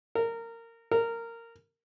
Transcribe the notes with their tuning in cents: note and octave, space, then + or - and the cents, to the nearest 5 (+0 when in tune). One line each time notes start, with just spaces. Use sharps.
A#4 -20
A#4 -15